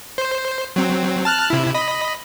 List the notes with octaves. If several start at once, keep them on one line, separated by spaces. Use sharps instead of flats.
C5
F#3 C4
A5 F6 F#6
C3 E4
D#5 B5